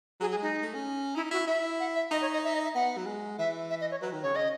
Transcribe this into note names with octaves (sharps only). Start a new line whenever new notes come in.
F#3 G#4
G#4
G#3
D#4
A3
C#4
D#4 E4
E4 F#4
E4 E5
F#5
E5
D#4 D#5
C#5
D#5
E5
D#5
E5
B3 F#5
F#3
G#3
E3 E5
E5
D#5
C#5
F#3 B4
D#3
C#3 C#5
C#3 D#5